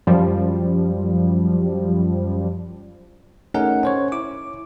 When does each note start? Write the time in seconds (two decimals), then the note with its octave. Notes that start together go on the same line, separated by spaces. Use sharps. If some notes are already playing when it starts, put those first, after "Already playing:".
0.07 F#2 F3 G3
3.54 A3 C#4 D#4 G#4 A#4 F#5
3.83 C#4 C5 C#5
4.12 E4 D6